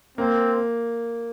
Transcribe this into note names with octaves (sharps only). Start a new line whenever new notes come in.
A#3 C4